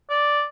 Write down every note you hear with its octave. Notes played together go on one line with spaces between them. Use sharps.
D5